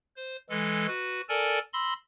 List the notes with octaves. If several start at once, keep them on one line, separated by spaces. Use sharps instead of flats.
C5
E3 G#3 A4
F#4 B4
A4 A#4 D5 G#5 A5
B5 C6 E6 A#6